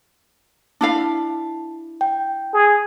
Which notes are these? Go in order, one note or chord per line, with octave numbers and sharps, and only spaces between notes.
D4 E4 F5 A5
G5
G#4